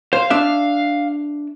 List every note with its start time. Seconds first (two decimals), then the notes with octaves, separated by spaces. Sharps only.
0.13 C5 F5
0.30 D4 E5